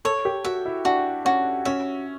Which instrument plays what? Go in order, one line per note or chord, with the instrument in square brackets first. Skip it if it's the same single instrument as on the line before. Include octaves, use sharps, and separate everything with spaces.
[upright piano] A4 [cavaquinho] C#5
[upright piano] G4
[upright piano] F#4 [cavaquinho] E5
[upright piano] E4
[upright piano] D4 [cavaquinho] F#4
[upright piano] C#4 [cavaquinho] F#4
[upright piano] C#4 [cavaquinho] E5